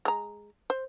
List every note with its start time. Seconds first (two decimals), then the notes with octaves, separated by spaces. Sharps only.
0.05 G#3 A#5
0.70 C5